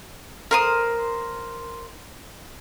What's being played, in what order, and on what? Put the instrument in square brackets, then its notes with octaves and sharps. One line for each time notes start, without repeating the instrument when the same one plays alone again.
[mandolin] A#4 C5 D#6